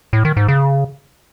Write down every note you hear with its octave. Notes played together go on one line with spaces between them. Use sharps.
A2
D#3
G#2
C#3